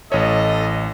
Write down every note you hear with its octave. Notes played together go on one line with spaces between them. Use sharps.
A1 A4 C#5 D#5